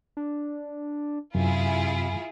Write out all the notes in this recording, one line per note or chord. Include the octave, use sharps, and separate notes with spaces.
D4
F#2 C3 E4 F4 G#4